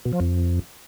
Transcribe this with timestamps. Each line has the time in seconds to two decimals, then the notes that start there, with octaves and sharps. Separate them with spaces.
0.05 B2
0.13 F3
0.20 F2